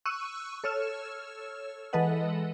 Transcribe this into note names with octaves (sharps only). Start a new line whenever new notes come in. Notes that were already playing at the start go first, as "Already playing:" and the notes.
C#6 E6 F#6 D#7
A4 C#5 E6 F6 E7
E3 G#3 A4 B4 D#5 F#5